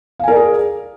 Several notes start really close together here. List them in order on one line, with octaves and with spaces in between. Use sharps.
F5 G#5 A#4 D5 G#4